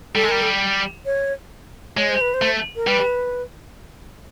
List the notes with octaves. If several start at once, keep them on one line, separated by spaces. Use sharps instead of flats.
G3 A4
G#3
G3 A#4
A4
C#5
G#3 C#5
C5
B4
C5
A3
A#4
G3 B4